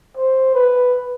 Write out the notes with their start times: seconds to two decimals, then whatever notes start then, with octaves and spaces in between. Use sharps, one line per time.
0.17 C5
0.55 B4